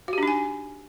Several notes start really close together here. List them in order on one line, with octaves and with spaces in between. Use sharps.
F#4 G4 D4 D#4 G#5